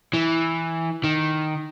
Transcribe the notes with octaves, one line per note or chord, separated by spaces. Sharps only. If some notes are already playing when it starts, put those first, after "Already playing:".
E3
D#3